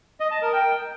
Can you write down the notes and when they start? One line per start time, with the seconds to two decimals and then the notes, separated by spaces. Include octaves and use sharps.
0.20 D#5
0.31 A5
0.42 A#4
0.53 G5